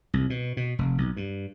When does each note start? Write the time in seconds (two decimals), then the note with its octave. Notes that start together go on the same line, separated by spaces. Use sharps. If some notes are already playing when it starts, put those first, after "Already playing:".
0.14 C2
0.30 B2
0.57 B2
0.79 F1
0.98 B1
1.16 G2